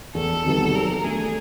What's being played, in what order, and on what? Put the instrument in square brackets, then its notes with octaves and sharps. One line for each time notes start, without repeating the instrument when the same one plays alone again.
[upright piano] E2 [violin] A4
[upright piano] C3 D#3 G3 B3
[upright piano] F#3 [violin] A#4
[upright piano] A3 D4 [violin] G#4